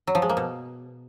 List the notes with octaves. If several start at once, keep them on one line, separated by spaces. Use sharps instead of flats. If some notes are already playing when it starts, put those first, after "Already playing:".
F#3
F3
G#3
A#3
B2